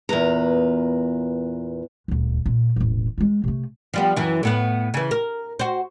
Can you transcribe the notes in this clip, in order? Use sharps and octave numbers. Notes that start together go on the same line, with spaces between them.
E2 A#2 B4 A#5
D#1 D2
A#2
E1 A1
G#3 F4
C3 A3
F3 G3 B3
F#2 E3
A2 B3 B4
C#3 E3
A#4
F#4 C5